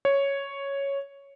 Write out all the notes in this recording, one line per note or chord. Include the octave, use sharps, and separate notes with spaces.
C#5